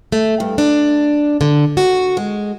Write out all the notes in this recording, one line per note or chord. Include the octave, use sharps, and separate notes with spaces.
A3
G2
D4
D3
F#4
G#3